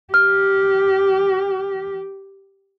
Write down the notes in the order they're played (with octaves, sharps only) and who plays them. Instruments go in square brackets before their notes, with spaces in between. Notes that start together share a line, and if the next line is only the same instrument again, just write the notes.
[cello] G4 [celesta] F6